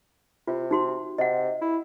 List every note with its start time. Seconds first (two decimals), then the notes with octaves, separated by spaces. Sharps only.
0.47 C3 F4
0.71 D#4 F#4 C6
1.18 C3 D#5 F#5
1.61 E4